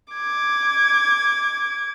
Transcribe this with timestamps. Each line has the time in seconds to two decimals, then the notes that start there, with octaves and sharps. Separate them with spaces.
0.13 D6 G#6